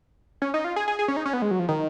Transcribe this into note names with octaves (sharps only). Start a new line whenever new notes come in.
C#4
D#4
F4
G#4
G#4
G#4
C#4
D#4
C#4
B3
G#3
F#3
F3
D#3